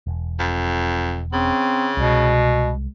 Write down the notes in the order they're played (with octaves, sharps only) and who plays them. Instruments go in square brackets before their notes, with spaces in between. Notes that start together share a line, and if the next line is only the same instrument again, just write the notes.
[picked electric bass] E1
[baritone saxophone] F2
[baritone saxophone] C#3 [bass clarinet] C4
[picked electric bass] C2 G#3 [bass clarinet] B2